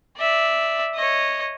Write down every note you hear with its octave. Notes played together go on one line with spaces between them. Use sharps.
D5 E5
C#5 D#5